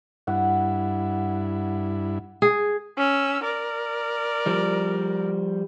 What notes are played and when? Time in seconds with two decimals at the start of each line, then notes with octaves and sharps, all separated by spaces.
0.27 G2 E4 F#5
2.42 G#4
2.97 C#4 E6
3.44 A#4 D5
4.46 F3 G3